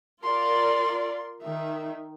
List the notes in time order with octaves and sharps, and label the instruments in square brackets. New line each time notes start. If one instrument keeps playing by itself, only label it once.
[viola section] F4 A#4 D5 [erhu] C6
[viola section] D#3 [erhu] E5